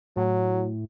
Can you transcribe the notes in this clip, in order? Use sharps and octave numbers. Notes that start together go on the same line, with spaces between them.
A2 F#3